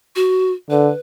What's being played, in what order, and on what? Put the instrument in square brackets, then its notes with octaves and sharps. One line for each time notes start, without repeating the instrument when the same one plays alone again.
[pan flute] F#4
[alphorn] D3 [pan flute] B4